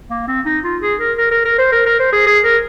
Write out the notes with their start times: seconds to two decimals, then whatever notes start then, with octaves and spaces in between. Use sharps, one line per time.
0.10 A#3
0.28 C4
0.46 D#4
0.64 F4
0.82 G#4
1.00 A#4
1.18 A#4
1.31 A#4
1.45 A#4
1.58 C5
1.72 A#4
1.86 A#4
1.99 C5
2.13 G#4
2.26 G#4
2.44 A#4